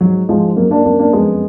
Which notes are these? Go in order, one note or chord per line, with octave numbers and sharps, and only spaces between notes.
G#2 F#3
G#2 F3 G#3
F#2 F#3 A#3
A#3 D4
F#2 A#3 D4
A#3 D4
F2 G#3 B3